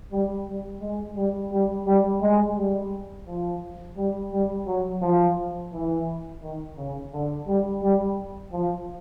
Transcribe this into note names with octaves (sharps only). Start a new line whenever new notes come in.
G3
G3
G#3
G3
G3
G3
G#3
G3
F3
G3
G3
F#3
F3
E3
D#3
C#3
D3
G3
G3
F3